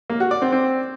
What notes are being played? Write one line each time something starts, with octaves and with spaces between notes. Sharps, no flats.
A#3
F#4
D5
C4
C4